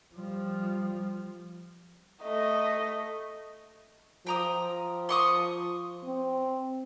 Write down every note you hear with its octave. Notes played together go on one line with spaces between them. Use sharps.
F3 G3
A3 D#5
F3 G5 A#5 D#6
C6 C#6 D#6
C4